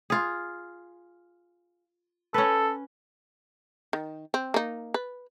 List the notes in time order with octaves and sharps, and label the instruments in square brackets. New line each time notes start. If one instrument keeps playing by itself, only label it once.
[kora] F4 G#4
[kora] C#4 B4 [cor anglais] A4
[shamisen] D#3
C4
A#3 D#4
B4